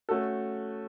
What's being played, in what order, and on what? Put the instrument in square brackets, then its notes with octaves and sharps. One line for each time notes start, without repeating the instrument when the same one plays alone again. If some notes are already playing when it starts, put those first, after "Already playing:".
[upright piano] A3 C#4 F#4 A4